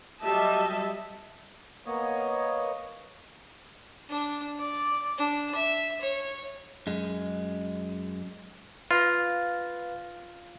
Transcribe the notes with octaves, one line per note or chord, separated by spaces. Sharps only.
F#3 G3 D#5 E5 A5
A#3 B3 C#5 D#5
D4
D5
D4
E5
C#5
F#2 G#3
F4 B4 F5 A#6